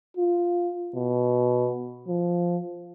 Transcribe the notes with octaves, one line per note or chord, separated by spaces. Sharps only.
F4
B2
F3